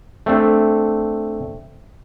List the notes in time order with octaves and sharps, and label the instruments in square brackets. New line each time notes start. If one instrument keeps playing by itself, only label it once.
[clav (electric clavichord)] A3 C4 D4